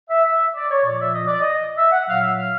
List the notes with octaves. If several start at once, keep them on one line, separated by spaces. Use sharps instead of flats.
E5
E5
D5
C#5
A#2 F3 D5
E5
D#5
D5
D#5
E5
F#5
A#2 F#3 F5
E5
F5